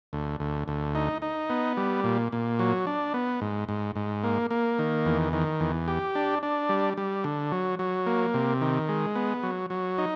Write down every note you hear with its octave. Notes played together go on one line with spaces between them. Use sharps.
D2
D2
D2
D#4
D#4
B3
G3
A#2
A#2
F#3
D4
B3
G#2
G#2
G#2
A#3
A#3
D#3
E2
D#3
E2
G4
D4
D4
G3
G3
D3
F#3
F#3
A#3
C3
D#3
G#3
B3
F#3
F#3
D#4